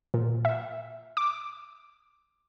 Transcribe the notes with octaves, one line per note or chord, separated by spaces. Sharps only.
A#2
E5
D6